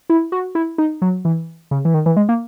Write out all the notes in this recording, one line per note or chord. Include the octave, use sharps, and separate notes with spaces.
E4
F#4
E4
D#4
F#3
E3
C#3
E3
D#3
E3
G#3
A#3